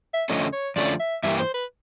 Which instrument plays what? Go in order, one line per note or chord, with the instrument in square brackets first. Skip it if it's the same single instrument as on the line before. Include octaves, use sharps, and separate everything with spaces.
[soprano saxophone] E5
[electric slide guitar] F2 D3 F3 A3 C#4 [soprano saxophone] D#5
[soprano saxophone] C#5
[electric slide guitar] F2 D3 F3 A3 C#4 [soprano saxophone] D5
[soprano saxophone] E5
[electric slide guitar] G2 E3 G3 A#3 [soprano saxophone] E5
[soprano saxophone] C5
B4